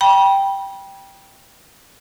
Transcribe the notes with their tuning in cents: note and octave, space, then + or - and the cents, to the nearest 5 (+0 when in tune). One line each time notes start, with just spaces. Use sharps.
G5 +0 B5 -30